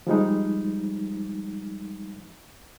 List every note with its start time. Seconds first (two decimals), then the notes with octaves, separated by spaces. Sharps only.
0.07 F3 G3 G#3 D#4